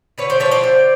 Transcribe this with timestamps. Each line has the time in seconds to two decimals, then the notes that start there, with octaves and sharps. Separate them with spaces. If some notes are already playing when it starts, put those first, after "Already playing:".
0.18 D3 B4 C#5
0.30 C5 D5
0.40 F3 B4 C#5
0.45 A3
0.51 C5 D5
0.63 D3